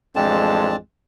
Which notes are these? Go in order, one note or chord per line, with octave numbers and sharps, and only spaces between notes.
A1 F2 G#3 C4 D4 A5